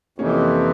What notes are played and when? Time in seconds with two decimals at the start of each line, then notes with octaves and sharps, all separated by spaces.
0.18 F2 C3 E3 A#3 C#4